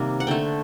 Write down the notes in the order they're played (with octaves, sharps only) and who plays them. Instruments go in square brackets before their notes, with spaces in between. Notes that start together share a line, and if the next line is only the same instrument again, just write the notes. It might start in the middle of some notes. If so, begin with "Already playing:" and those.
Already playing: [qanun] C3 D#3 G3 A#3
F#5
D3 A3 G5